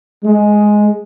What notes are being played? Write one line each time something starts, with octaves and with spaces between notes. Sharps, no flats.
G#3